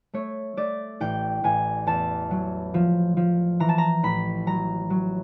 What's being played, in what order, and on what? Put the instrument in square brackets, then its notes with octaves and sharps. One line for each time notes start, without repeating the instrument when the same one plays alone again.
[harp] A3 C#5
A3 D5
A1 G5
A1 G#5
E2 A5
F#3
F3
F3
E3 A#5
A5
A#5
A1 B5
F#3 A#5
F#3